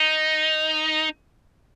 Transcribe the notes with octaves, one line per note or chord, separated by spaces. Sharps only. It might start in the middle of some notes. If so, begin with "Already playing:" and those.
Already playing: D#4